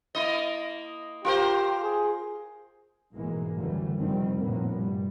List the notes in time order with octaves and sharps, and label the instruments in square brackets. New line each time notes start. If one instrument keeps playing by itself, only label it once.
[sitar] A#3 E4 D#5
[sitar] F4 A#4 C5 [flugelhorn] G4
[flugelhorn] G#4
[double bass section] B1 G#2 E3 G#3 A#3
F#1 D2 D3 E3 G3 A3
F1 D#3 G3 C4
F1 A#1 F2 A2 A#3 B3
G2 G3